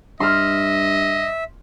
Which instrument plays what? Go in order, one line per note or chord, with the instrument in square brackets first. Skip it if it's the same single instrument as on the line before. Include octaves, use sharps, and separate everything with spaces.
[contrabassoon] G2 [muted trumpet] D#5 [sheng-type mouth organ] E5 [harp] C6 F6